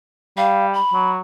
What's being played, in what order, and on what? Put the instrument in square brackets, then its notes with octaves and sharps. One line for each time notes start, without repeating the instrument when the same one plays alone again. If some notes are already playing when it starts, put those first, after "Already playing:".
[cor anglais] G3 [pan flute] F5
[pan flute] B5
[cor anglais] F#3